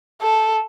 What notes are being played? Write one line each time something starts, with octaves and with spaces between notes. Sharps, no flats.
A4